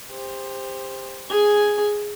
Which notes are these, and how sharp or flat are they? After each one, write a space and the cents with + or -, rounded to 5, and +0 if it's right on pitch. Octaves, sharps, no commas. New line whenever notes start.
G4 +30 C5 +0
G#4 +0 G#5 +0